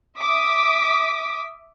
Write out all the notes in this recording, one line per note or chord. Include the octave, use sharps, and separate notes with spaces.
E5 D6 D#6 B6